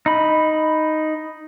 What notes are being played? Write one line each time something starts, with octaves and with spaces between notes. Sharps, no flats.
D#4 B5